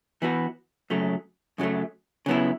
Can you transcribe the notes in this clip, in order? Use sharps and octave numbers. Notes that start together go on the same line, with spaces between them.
E3 B3 F#4 B4
F#2 C#3 F#3 A3
F#2 C#3 F#3 A3
C#3 F#3 B3 E4